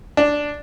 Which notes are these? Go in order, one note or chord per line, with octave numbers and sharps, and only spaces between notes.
D4